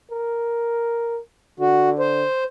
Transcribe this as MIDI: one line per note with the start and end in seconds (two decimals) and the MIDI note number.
0.11 1.20 70
1.60 2.24 50
1.60 1.90 66
1.99 2.44 72